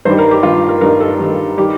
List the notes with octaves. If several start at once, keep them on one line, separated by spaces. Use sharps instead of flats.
G2 D#3 G3 C5
A#4
G4
G2 D#3 G3 F4
A#4
G2 D#3 G3 A#4
A4
G2 D#3 G3
D#3 G3 G4